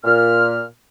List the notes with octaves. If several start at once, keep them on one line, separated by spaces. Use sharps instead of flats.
A#2 F6